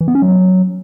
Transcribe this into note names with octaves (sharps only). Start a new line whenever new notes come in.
E3
B3
C#4
F#3